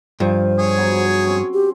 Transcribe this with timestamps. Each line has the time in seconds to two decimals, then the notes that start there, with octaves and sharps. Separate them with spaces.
0.20 G2 F3 C5
0.59 G#4 C#5
0.78 F#3 B3
1.25 C4 C#4
1.54 G4